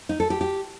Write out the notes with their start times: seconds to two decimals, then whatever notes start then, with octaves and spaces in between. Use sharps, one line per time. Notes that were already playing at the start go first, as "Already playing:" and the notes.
0.09 D#4
0.20 A4
0.30 G4
0.41 G4